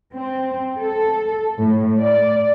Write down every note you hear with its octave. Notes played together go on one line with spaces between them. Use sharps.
C4
A4
A2
D5